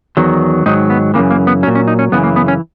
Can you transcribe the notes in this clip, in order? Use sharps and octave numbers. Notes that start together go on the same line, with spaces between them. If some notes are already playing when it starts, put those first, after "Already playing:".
E2 D#3 F#3
G#2 D#3 F#3 D#4
B3
F#2 C#3 E3 A#3
A#3
B3
A#2 F#3 C#4
C#4
D#4
C#4
F#2 C#3 E3 B3
A#3
B3
C#4